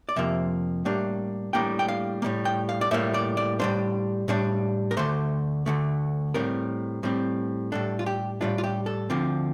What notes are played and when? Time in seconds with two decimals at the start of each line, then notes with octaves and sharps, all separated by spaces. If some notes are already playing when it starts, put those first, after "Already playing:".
0.09 D5
0.16 F2 C3 F3 A#3 E5
0.85 A2 G3 A#3 D4
1.53 A2 G3 A#3 D4 G5
1.79 G5
1.88 F5
2.22 A2 G3 A#3
2.45 G5
2.69 F5
2.81 D5
2.91 A2 G3 A#3 E5
3.14 D5
3.37 D5
3.60 A2 G3 D4 C5
4.28 A2 G3 D4
4.91 A#4
4.97 D2 D3 A3 C5
5.66 D2 D3 A3
6.34 A2 G3 C4 A#4
7.03 A2 G3 C4
7.72 A2 G3 D4 A4
7.99 F4
8.06 G4
8.41 A2 G3 D4 F4
8.58 F4
8.64 G4
8.86 A4
9.10 D2 D3 F3 C4